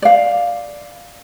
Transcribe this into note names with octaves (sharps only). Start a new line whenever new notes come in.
D5 F5